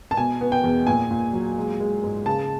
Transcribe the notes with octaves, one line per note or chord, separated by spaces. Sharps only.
A5
B2 G#5
B3
G5
E2
A#2 G#5
A#2
F#3
G#3
G#3
G#2
C#3 A5